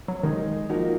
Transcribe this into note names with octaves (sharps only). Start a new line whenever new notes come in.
F#3
D#3 G#3 D#4 G#4
F3 A#3 D#4 F#4 A#4